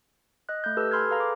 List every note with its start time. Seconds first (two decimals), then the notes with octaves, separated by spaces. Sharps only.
0.49 D#5 F#6
0.64 A3 F#6 G6
0.77 G4 A4 B4 E6
0.91 G#5 B5 C6 F6 G#6
1.09 G#4 A4 B4 F5 A#5
1.20 D6